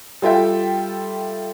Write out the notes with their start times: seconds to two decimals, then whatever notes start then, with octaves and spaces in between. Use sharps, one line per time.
0.22 G3 F4 A4 E5 G5